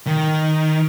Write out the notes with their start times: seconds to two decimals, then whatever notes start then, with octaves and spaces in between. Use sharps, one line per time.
0.07 D#3